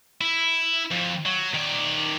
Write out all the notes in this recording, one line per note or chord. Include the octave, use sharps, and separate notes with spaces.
E4
F2
F#3
D#3 D5